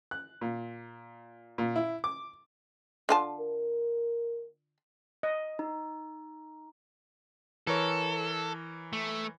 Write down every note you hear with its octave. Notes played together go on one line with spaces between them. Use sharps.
F#6
A#2
A#2
E4
D6
D3 F4 A5
A#4
D#5
D#4
E3 A4 A#4 C#5
A3